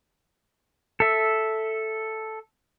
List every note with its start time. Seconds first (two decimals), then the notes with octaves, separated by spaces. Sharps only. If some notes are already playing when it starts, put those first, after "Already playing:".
1.00 A4 E5